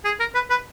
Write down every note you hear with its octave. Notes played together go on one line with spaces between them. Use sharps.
G#4
A#4
B4
B4